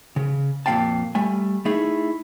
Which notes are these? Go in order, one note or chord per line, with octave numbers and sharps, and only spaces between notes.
C#3
F2 A#2 F4 F5 G5 A5
G3 A3 G#5
A3 D#4 E4 G#4